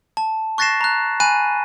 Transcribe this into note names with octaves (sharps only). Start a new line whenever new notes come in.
A5
C#6 F#6 A6 A#6 C7 E7
A#5 F#6
G#5 B5 F#6 D#7